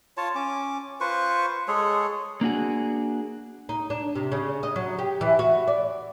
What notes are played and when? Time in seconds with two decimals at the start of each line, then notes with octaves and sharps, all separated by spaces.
0.17 F4 C#5 A5
0.35 C#4 D6
1.01 F4 B4 C5 C#6
1.68 G#3 G#4 A4 C#5
2.41 A#3 D4 F#4 G#4
3.69 D#4
3.90 D4
4.15 C3
4.32 C#3
4.63 D#5
4.76 F#3
4.99 G4
5.21 E3
5.39 F#4
5.68 D5